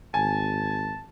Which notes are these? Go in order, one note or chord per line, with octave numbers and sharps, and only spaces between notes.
G#1 G#5 A5